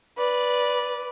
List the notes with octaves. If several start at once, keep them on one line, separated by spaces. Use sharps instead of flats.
B4 D5